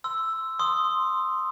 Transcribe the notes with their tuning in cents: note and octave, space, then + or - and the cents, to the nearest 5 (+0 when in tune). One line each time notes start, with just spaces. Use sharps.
C6 -10 E6 +0
C6 +0 D#6 +0